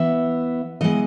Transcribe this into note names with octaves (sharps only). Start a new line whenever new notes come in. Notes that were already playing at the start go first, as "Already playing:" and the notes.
Already playing: E3 B3 E5
E3 G#3 B3 D#5